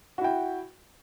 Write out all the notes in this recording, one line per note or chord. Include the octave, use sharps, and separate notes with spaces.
E4 F#4 G5